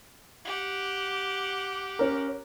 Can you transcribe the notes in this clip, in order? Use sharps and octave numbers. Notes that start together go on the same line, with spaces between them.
G4 F#5
C#4 A#4